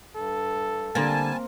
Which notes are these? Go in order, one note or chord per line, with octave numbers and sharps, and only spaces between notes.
G2 A4
D3 G3 A#3 C4 G#5 A5 A6